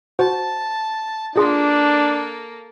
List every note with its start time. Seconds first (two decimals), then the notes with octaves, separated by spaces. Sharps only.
0.19 F#4 C5 F#5 A5
1.36 A#3 D4 F4 G#4 A4 C6